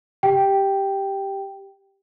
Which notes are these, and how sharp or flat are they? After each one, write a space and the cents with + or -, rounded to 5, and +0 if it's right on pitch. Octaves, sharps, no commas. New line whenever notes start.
G4 +0 G5 +0